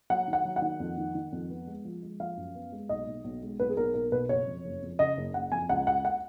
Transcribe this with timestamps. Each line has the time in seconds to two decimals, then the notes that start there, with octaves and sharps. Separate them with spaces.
0.10 F#3 F#5
0.27 D#3
0.33 F#5
0.45 F#3
0.56 F#5
0.62 D#3
0.80 F2
0.97 D#3
1.15 D#3
1.32 F2
1.50 B3
1.67 G#3
1.85 F3
2.03 G#3
2.20 F3 F5
2.37 F#2
2.55 B3
2.72 G#3
2.89 B1 D#5
3.07 B1
3.24 B1
3.42 G#3
3.59 B1 B4
3.70 G#4
3.77 B1 A#4
3.94 B1 A#4
4.12 B2 B4
4.29 F#1 C#5
4.47 F2
4.65 F#1
4.82 F2
4.99 C#3 D#5
5.17 F#1
5.34 F#1 F#5
5.52 F2 G#5
5.69 C#2 F#5
5.87 C#2 F#5
6.05 F#5